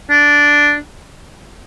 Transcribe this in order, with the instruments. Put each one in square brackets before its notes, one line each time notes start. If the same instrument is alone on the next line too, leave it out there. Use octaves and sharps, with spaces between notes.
[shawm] D4